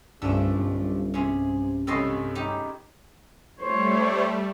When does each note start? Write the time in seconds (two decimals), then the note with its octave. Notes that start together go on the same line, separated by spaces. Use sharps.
0.22 G1 C2 G2 F3 A3 C#4 D4 E6
0.53 B1 G2
1.14 C3 C#4 G#4
1.87 C#2 A2 C3 A4 C#5 D#5 C6
2.35 D#4 G4
3.60 G3 A3 C5 C#5